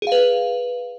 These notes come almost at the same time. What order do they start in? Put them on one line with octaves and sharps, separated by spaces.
G#4 F5 B4